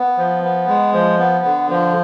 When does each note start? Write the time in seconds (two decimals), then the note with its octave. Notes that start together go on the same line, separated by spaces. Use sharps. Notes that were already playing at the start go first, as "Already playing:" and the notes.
Already playing: B3
0.17 F3
0.43 B3
0.67 G#3
0.93 F3
1.19 B3
1.45 D3
1.69 F3